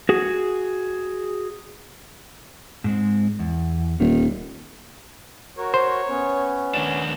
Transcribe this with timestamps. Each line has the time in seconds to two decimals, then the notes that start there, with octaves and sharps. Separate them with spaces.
0.09 F#4 G#4
2.84 G#2 G#3 C4
3.39 E2
4.00 D#1 D#3
5.58 F#4 A#4 C#5
5.74 C5
6.09 B3 C#4
6.74 D#2 D4